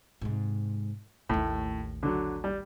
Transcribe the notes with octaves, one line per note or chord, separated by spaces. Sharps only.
G#2 C3
A1 D#2 A2
D3 F#3
G3